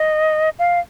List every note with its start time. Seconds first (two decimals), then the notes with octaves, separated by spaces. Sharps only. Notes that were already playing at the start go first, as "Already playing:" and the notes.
Already playing: D#5
0.59 F5